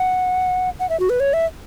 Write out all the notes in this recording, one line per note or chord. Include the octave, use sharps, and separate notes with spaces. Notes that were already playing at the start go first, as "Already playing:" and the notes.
Already playing: F#5
F#5
E5
F#4
B4
C#5
E5